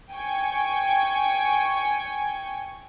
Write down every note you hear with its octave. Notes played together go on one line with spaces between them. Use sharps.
G5 G#5 C#6